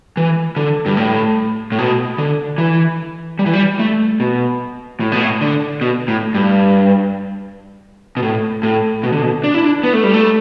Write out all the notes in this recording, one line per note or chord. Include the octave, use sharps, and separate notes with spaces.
E3
D3
G2
A2
A2
B2
D3
E3
G3
E3
G3
A3
B2
A2
B2
A2
D3
B2
A2
G2
B2
A2
A2
B2
D3
B2
D4
E4
D4
B3
A3
G3
A3